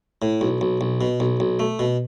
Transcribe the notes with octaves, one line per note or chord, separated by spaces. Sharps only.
A2
B1
B1
B1
B2
B1
B1
A3
B2